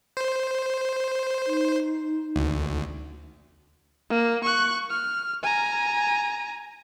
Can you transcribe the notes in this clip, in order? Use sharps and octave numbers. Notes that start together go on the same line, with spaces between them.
C5
D#4
D2
A#3
C#6 F#6
F6
G#5 A#5